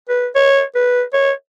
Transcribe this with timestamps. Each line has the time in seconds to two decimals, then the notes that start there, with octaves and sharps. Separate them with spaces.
0.09 B4
0.35 C#5
0.75 B4
1.13 C#5